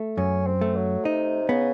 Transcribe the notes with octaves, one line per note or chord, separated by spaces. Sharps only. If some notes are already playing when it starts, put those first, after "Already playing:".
Already playing: A3
F#2 C#4
C4
A3
F#3
C3 D#4
C#3 B3